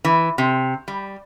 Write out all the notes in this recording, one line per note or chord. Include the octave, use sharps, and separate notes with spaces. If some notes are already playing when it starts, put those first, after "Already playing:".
E3
C3
G3